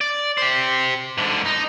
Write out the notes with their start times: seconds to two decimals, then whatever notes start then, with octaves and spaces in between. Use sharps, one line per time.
0.01 D5
0.38 G4 C5
1.18 G#2 D3
1.46 D#4